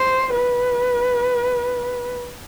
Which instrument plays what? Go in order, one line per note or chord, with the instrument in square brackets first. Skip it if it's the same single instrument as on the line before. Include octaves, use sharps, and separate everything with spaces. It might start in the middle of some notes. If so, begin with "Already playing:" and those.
Already playing: [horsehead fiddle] C5
B4